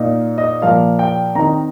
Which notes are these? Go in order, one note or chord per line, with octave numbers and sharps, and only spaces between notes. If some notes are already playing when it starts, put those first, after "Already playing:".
Already playing: A#2 A#3 D#4
D#5
A#2 F3 A#3 F5
G5
D#3 C4 D#4 A#5